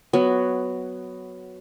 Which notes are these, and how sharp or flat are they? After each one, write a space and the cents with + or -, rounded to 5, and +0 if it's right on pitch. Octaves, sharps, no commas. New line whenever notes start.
F#3 +0 B3 +10